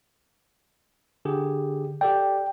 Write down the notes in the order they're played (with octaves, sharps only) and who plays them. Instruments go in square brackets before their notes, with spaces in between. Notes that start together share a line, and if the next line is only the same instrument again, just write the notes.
[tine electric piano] D3 G4 G#4
[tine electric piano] G4 A4 D5 [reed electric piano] G5